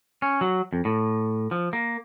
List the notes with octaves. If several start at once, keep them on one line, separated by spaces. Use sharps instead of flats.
C#4
F#3
F2
A2
F3
A#3